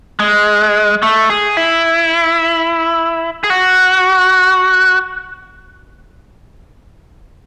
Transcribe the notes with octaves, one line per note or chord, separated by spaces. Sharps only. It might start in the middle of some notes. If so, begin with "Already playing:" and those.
G#3
A3
G#4
E4
G#4
F#4